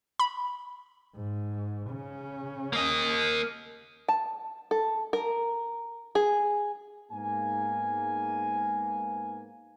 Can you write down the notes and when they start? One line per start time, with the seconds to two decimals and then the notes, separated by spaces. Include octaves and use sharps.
0.20 B5
1.15 G#2
1.90 C#3 C#4
2.73 A#3 D#5
4.08 A5
4.71 A4
5.13 A#4
6.15 G#4
7.11 G#2 A#3 B3 G#5